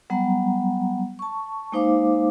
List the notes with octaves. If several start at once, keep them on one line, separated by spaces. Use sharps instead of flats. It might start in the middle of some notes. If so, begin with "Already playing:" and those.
F#3 G3 B3 F#5 A#5
A5 C#6
G#3 A#3 D#4 C5 F5 D6